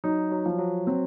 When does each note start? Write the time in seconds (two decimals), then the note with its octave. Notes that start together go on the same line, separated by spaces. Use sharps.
0.04 F#3 D#4
0.32 F#3
0.46 F3
0.59 F#3
0.87 F#3 C4